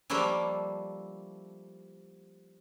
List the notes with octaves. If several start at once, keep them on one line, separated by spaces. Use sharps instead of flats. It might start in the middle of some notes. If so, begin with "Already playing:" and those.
F3 G3 A3 A#3 D4 E4